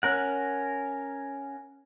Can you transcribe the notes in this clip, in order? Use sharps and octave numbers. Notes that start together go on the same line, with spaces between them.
C#4 A#4 F#5